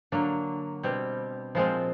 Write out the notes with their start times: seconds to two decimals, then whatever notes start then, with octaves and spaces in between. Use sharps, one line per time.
0.12 D3 F#3 A#3 D4
0.83 B2 G3 C4
1.55 A#2 F3 G#3 C4 F4